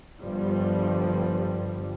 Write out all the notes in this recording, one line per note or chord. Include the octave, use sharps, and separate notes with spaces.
G1 G2 F3 G3